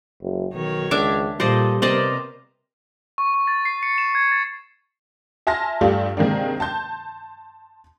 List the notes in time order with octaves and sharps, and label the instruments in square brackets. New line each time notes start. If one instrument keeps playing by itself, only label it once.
[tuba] F#1
[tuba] B1 [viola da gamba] D#3 C#5
[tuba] C#2 [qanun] D4 E5 D6
[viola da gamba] A#2 A4 [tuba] G3 [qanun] C5 D5 D#5
[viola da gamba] C3 B3 A#4 [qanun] C5 D5 D#5
[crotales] C#6
C#6
A6
C7
C#7
E7
G#6
A6
[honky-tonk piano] E5 G#5 A5 C6 F6 A#6
G2 A3 D4 F4 G4
C3 D#3 G#3 A#3 D4
A5 C6 G6